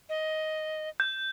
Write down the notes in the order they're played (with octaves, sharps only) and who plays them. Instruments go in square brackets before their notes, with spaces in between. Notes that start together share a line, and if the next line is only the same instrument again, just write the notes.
[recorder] D#5
[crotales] G6